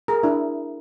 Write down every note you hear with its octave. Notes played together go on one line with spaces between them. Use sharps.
G#4 A#4
D4 E4